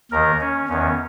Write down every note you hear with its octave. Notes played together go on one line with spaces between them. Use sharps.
D#2 D#3 A#4
C#4
E2 D#3 C#4